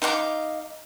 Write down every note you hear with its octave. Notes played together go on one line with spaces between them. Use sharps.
D#4 F5 F#5 D6